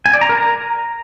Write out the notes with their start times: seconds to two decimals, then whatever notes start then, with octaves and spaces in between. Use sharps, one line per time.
0.06 G#5
0.14 D5
0.21 A#5
0.29 A#4
0.37 A#5